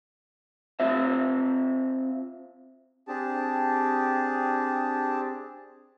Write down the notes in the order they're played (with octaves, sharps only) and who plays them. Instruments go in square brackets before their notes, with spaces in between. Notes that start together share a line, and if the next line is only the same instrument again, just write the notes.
[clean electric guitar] C4 F4 C5 E5
[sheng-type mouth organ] C4 D4 G4 G#4 A5